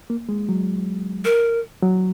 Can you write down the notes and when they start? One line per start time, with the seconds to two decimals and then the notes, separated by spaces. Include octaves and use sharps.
0.10 A#3
0.29 G#3
0.49 F#3
1.25 A#4
1.82 F#3